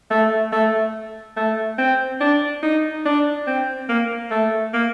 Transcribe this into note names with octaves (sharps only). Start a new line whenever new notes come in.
A3
A3
A3
C4
D4
D#4
D4
C4
A#3
A3
A#3